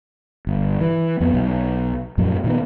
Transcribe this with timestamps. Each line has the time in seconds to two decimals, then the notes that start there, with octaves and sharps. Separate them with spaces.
0.47 G1
0.81 E3
1.21 F2 B3
1.34 B1
2.18 F#2 A#2 F3
2.44 A#2 D#3 B3